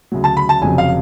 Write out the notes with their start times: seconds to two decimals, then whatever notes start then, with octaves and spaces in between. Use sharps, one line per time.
0.12 D2 C#3 F#3
0.24 A5
0.37 B5
0.49 A5
0.61 F1 F2 C#3 F#3 G#5
0.78 F5